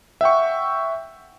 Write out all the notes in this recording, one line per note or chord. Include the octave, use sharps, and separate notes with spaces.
E5 F#5 G5 C#6